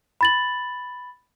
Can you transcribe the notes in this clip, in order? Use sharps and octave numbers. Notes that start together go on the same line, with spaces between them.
B5 A6 F#7